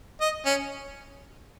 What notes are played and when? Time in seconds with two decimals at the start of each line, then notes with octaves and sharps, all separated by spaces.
0.21 D#5
0.46 C#4